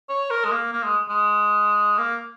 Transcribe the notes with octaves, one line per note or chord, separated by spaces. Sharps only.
C#5
A#4
G#3
A#3
A#3
G#3
G#3
A#3